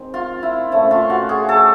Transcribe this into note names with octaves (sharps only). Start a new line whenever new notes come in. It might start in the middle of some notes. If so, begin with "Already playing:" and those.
Already playing: D#3 G#3 C4
F4
E4
A#2 F3 A3 C#4 E4
F4
F#4
G#4
A4